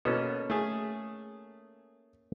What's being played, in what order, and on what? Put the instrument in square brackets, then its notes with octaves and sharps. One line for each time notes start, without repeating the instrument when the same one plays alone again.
[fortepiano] B2 [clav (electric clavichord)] A#3 C#4 A4
[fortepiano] A3 G#4